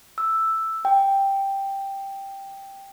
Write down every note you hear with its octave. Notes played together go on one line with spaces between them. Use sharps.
E6
G5